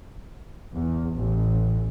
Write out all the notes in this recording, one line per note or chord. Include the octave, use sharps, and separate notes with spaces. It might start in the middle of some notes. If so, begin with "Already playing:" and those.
E2
A1